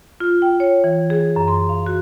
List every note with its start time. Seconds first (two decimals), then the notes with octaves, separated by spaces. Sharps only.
0.20 F4
0.42 G5
0.60 C#5
0.84 E3
1.10 G#4
1.36 F#2
1.48 C6
1.69 F5
1.86 F#4